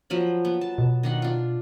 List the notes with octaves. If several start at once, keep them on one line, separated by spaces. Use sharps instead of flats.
F3 F#3 B5
B3
A5
B2
D#3 D4 F#5
D4 F4